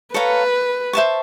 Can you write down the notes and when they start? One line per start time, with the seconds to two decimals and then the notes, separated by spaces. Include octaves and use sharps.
0.14 A4 B4 C#5 F5 A#5
0.93 C5 E5 A5 C#6